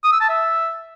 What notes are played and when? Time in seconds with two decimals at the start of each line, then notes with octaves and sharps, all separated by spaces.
0.04 D#6
0.12 E6
0.21 A5
0.29 E5